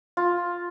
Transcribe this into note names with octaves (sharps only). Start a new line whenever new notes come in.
F4